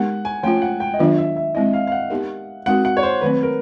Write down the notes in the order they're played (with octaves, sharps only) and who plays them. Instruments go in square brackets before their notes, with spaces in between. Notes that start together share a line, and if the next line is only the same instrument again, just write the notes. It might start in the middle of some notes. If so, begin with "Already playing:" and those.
Already playing: [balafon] G#3 B3 D#4 G4 A#4 [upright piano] F#5
[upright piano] G#5
[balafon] F3 A3 C#4 F4 [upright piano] G5
[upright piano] F#5
G5
D#5
[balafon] D#3 F#3 B3 D4 F4 [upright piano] E5
[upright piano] E5
E5
[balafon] G#3 C4 E4 [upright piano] D#5
[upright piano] F5
F5
F#5
[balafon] B3 D#4 G4 A#4
[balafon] G#3 C4 D#4 F#4 A#4 [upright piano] F#5
[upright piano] F#5
C#5
C5
[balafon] D#3 F#3 A3 C4 [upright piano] B4
[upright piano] A#4